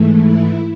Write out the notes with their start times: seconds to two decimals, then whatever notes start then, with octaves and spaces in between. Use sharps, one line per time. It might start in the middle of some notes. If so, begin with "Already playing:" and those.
Already playing: G#2 E3 A3
0.20 E4